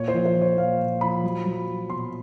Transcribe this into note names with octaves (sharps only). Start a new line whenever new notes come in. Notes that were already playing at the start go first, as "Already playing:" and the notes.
Already playing: A#2 C#5
C5
F3
C5
F3
C#5
A#2 F5
A#2
F3 B5
F#3
F#3
F#3
B2 C6